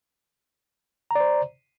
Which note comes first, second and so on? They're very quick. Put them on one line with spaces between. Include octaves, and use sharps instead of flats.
A#5 D5 C5